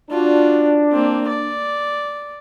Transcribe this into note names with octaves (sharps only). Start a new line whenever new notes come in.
D4 F4 F#4
A#3 C4
D5